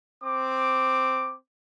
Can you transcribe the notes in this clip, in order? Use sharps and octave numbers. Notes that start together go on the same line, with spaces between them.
C4 D6